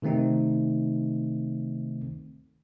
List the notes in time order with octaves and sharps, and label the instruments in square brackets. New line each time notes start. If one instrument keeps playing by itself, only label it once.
[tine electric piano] C3 D#3 A3 C4 D#4